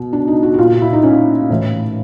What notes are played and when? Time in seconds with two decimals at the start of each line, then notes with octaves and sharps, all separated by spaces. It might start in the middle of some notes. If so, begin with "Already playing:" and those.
Already playing: B2
0.13 D4
0.27 D#4
0.43 F#4
0.54 F#4
0.58 A#2 F4
0.69 F#4
0.82 E4
0.93 D#4
1.04 C#4
1.50 A2 E3